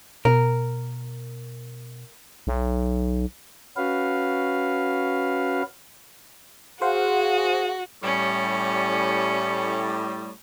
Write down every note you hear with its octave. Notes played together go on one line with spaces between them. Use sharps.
B2 A#4
B1
C#4 F#4 B4 F5
F#4 G#4 C5 F5 F#5
A2 G3 C#4